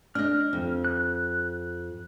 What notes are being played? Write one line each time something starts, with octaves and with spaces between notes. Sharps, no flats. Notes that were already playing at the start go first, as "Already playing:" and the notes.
D4 D#5 F6
F2
F#6